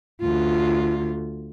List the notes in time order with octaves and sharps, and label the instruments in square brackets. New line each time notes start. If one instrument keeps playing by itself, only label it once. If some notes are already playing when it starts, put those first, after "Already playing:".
[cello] D2 F4